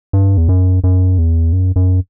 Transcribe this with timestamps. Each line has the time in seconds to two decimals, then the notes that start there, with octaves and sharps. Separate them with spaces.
0.13 G2
0.37 E2
0.49 F#2
0.84 F#2
1.18 E2
1.52 F#2
1.76 F#2